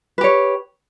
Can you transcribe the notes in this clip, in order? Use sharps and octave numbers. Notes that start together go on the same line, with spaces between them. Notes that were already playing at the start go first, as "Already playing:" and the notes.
G4 B4 C#5